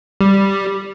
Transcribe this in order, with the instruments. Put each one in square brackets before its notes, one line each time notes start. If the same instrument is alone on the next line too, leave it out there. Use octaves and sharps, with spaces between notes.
[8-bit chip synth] G3